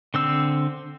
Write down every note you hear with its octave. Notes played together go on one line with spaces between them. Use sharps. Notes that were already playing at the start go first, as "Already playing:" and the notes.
D3 C4 E6